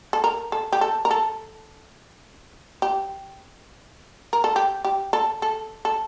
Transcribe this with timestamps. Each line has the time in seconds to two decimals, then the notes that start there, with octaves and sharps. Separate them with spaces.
0.13 A4
0.24 A#4
0.52 A4
0.72 G4
0.81 A4
1.05 A#4
1.11 A4
2.82 G4
4.33 A#4
4.44 A4
4.56 G4
4.84 G4
5.13 A4
5.42 A4
5.85 A4